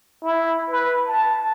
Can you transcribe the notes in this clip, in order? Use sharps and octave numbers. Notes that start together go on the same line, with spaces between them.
E4
B4
A5